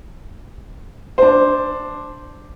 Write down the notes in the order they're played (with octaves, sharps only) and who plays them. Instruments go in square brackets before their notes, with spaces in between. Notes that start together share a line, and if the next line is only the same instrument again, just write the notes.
[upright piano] D4 C5